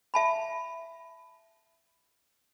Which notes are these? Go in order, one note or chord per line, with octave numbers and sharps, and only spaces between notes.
E5 A5 B5